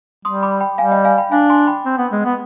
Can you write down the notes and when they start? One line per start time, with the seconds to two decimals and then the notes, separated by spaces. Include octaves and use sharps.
0.25 G3 C6 D#6
0.43 B5 D6
0.61 G5 B5
0.78 G3 F5 G#5
0.91 D#5 G5
1.05 F5 G#5
1.18 G5 B5
1.32 D4 F5 G#5
1.50 G#5 C6
1.67 G5 B5
1.86 C4
1.98 B3
2.12 G#3
2.25 B3